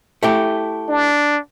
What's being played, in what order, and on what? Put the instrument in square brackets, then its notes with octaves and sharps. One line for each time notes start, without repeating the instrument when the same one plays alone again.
[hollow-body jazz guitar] A3 E4 G4
[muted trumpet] D4